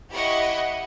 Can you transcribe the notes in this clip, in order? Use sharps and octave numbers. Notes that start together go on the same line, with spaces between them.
E4 G4 D#5 F#5 B5 C#6